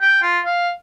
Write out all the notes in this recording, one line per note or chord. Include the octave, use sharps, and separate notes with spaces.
G5
F4
F5